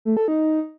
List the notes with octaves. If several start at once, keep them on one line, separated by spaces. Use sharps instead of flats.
A3
A4
D#4